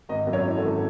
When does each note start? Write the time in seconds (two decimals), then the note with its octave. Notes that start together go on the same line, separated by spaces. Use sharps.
0.09 G#1 D#5
0.27 F#2
0.33 C#5
0.45 E3
0.56 A4
0.62 G#1